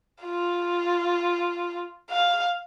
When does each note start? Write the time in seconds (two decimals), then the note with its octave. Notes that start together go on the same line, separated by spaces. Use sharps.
0.24 F4
2.10 F5